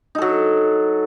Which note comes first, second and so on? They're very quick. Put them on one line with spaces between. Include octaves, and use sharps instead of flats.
D#4 A4 F#3